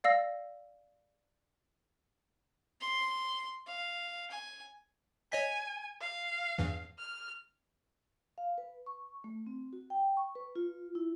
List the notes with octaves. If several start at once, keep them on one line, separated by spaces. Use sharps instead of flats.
D5 F5 E6 A#6
C6
F5
G#5
C#5 D#5 G#5 B6
F5
E2 G2 E3
F6
F5
B4
C#6
A3
C4
F#4
G5
C#6
B4
F4
E4